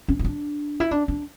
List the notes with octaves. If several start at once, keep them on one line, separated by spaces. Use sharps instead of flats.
C#4
E4
D4
E4
D4
D4